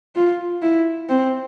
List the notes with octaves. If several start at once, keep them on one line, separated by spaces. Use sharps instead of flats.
F4
E4
C4